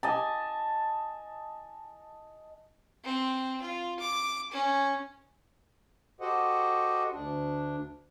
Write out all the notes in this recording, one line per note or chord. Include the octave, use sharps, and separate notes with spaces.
D#5 G#5 A5
C4
F4
D6
C#4
F#4 G4 A4 C5 D#5 F#5
D2 D4